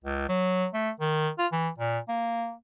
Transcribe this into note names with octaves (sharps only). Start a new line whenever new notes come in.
C#2
F#3
A3
D#3
F4
E3
A#2
A#3